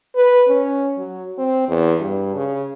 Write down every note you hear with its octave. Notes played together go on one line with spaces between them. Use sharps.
B4
C#4
F#3
C4
E2
G2
C#3